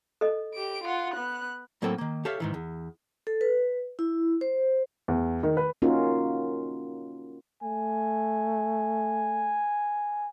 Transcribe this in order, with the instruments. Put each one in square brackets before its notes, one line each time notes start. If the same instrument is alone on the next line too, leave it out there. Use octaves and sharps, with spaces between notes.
[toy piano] A4 D#5
[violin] G4 D7
F4 F#5
B3 F#6
[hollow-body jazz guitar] A2 F#3 A#3 C4 A4 G5
D#3 A#3
G4 A4 C#5 E5 F5
G#2 D#3 E3
E2
[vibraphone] A4
B4
E4
C5
[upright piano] E2
D#3
B4
[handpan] A#3 C#4 D#4 F4 F#4 A#4
[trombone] A3 [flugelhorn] G#5